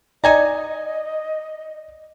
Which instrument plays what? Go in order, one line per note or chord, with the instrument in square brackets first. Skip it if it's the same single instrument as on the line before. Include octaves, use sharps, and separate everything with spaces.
[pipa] D#4 G#5 A#5 [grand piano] D5 [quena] D#5